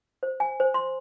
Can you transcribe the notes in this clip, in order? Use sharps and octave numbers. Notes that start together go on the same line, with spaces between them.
C5
G#5
C5
C6